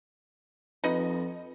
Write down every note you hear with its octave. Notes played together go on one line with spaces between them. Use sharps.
F2 D#4 B4 D#5